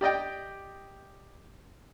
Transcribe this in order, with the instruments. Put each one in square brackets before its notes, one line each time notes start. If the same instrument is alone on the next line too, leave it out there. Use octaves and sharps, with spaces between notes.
[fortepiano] G4 D5 D#5 G5